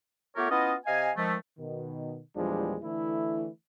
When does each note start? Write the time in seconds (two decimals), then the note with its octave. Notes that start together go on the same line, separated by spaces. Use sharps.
0.36 A3 B3 F4 G4 A#4 C#5
0.49 B3 C#4 E4 F4 D#5
0.86 C3 D#5 F5 G#5
1.16 D#3 F3 G#3 A3
1.58 B2 D#3
2.36 E2 A#2 F3 G3 G#3 D4
2.83 D3 E3 A3 E4